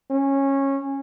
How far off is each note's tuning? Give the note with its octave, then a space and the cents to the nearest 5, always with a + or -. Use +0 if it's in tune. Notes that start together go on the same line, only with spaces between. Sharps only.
C#4 -15